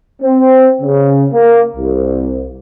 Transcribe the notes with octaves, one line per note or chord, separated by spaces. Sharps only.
C4
C#3
A#3
C2